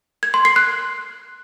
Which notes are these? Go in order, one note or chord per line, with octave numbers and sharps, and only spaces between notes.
G#6
C6
C7
F#6